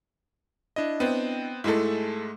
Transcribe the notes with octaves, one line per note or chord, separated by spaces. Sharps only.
D4 E4 D#5
B3 C4
G#2 G#3 A3 E4 A4